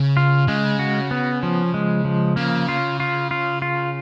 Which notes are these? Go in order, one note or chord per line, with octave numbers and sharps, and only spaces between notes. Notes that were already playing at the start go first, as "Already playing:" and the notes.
Already playing: C#3
F4
C#3 G#3
F#4
B3
F3
G#3
F3
C#3 A#3
F4
F4
F4
F4